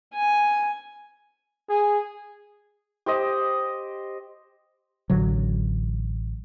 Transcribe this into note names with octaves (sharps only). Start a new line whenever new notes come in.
G#5
G#4
G4 C5 D#5
A1 D3 F#3